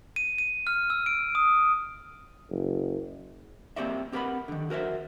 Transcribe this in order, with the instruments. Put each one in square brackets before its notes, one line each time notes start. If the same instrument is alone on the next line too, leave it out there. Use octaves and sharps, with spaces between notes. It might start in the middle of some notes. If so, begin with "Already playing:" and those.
[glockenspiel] D#7
D#7
F6
E6
D7
D#6
[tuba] F#1
[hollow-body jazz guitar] A#3 C4 G4 C#5 D5 E5
C4 G4 A#4 B4 F#5 B5
D3 D#3
F#4 A#4 C5 E5